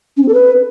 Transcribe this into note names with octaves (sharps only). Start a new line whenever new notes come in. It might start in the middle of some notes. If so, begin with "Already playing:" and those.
C#4
C4
A4
B4